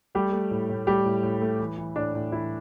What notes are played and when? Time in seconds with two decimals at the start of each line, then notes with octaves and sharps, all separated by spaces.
0.15 G3 A3 G4
0.33 A3
0.51 A2
0.69 A2
0.87 G3 A3 G4
1.06 A2
1.23 A2
1.41 A3
1.60 E3
1.78 E3
1.96 A2 D4
2.15 A2
2.32 E3 E4